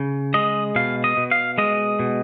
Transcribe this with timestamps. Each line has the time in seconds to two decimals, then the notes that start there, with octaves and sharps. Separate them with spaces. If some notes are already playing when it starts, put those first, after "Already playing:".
Already playing: C#3
0.34 G#3 D#5
0.76 B2 F5
1.04 D#5
1.17 B2
1.31 F5
1.58 G#3 D#5
1.99 B2